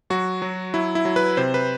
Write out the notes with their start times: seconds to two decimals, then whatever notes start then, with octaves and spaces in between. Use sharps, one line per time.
0.10 F#3 F#4
0.42 F#3
0.74 F#3 E4
0.95 E4
1.05 F#3
1.16 B4
1.37 C3 C5
1.54 B4